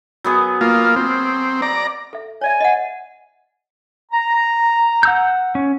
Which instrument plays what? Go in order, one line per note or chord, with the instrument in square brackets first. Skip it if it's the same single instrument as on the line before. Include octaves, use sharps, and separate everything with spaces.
[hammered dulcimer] F#3 B3 G#4
[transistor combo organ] A#3 F4
C4
D5 A#5
[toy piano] A4 E5
[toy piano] C#5 D5 E5 [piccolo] G#5
[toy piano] D#5 F#5
[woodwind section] A#5
[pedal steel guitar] F#5 E6 G6
C#4